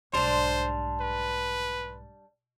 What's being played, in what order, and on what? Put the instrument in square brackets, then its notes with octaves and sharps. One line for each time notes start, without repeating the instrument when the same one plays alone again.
[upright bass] B1 G#2 [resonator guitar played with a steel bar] G3 D4 [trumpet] C5 [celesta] C6 E7 F7
[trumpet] B4